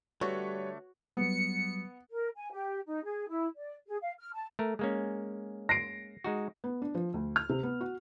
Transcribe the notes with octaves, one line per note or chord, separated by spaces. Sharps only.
D3 G3 A3 F#4 B4 C#5 C#6
F#3 G3 B3 C#7
A#4
G#5
G4
D#4
G#4
E4
D5
G#4
F5
F6
A5
A3 A#4
G#3 A#3 C#4
A#6 C7 D7
G#3 D#4 F#4
B3
D4
F3
D2
F6
C3
B3
F#4